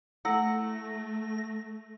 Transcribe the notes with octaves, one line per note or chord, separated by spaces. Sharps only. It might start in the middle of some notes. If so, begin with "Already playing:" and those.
A3 E4 A4 F#5 E6 A#6